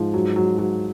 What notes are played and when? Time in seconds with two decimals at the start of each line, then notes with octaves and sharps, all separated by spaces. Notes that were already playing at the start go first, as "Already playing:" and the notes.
Already playing: G#2 F3
0.14 F#3
0.36 F#3
0.58 F#3